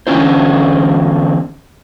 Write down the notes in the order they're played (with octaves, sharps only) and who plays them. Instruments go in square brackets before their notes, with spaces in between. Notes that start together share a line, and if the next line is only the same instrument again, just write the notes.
[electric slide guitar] E2 D3 C#4 D4 E4 C5